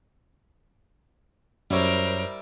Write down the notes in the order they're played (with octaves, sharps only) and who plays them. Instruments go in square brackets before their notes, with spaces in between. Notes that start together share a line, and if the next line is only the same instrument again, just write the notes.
[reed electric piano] F#2 C#5 [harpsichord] G3 E4 G4 [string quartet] A#4 C5